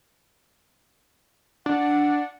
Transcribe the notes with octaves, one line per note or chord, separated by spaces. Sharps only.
D4 F#5